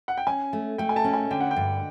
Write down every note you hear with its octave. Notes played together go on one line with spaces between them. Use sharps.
F#5
G5
C#4 G#5
A3
A3 G5
G#5
A5
C#4
G#5
D3 G5
F#5
G5
G2